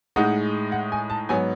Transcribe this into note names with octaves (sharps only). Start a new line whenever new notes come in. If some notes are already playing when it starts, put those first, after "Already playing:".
A2 G#3 D#4 F#5
F#5
G#5
A5
G#2 F#3 B3 G#5